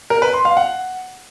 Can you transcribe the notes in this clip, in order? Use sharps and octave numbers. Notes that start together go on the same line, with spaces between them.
A#4
B4
C6
F5
F#5